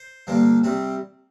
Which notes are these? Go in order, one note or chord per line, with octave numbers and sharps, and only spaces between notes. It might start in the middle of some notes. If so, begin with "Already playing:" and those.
Already playing: C5
G2 D3 F3 A#3
C3 G3 C4